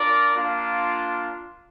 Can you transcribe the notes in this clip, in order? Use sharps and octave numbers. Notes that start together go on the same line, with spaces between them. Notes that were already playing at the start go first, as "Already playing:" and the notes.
Already playing: D4 F4 A#4 D5
A#3 D4 F4